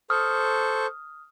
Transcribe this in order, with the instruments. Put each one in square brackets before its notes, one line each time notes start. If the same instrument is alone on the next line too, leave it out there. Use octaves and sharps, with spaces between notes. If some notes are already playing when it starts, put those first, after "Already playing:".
[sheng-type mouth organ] A4 C5 C#6 [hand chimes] D#6 F6